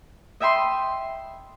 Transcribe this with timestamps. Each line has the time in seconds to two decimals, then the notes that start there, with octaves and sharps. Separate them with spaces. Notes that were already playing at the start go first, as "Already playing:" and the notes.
0.40 D#5 E5 G5 B5 C6